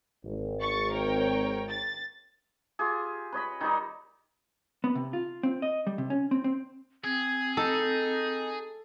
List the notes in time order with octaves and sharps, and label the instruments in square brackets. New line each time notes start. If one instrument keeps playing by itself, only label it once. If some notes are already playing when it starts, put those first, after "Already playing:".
[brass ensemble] G#1
[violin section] C#6 A6 C#7
A#4 C#5 G5
A6
[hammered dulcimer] F4 G4 G#4
B4 C#5 D#5 B5
D#3 G3 D#4
[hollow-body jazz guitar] B3
C3
F4
C4
D#5
G3
C3
C#4
C4
C4
[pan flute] C4 [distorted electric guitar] G#4 [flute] G#6
[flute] D#4 [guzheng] A4